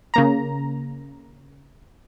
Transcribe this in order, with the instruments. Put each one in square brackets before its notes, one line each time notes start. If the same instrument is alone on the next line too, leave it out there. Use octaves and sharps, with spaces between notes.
[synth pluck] C#3 A#3 A#5